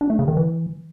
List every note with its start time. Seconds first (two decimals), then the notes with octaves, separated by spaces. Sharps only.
0.01 D4
0.10 A3
0.19 C#3
0.28 D#3
0.37 E3